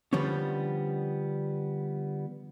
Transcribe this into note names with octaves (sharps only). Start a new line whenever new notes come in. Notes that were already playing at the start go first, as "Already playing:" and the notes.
D3 F3 G3 B3 C#4